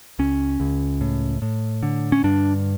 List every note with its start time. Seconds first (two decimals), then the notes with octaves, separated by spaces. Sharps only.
0.19 C#2 C#4
0.60 C#2
1.01 A2
1.42 A2
1.83 D3
2.12 C#4
2.24 G2 D4